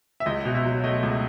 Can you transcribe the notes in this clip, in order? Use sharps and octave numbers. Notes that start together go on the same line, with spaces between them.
E5
C#2 D#5
B2
E5
F#3
A3 D#5
C#2